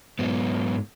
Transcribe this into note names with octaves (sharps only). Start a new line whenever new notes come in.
G#2 F#3 B3